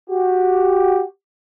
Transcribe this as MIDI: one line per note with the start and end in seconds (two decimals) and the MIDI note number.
0.10 1.03 66
0.10 1.03 67